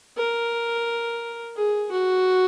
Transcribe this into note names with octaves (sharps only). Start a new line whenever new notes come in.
A#4
G#4
F#4